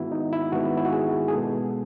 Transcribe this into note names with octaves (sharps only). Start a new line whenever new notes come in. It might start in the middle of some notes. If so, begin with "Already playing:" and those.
Already playing: G#2 D#3 G#3 B3 E4 F#4
D#4
E4
G#2 D#3 G#3 B3 F#4
E4
F#4
G#4
G#4
B2 G#3 B3 A4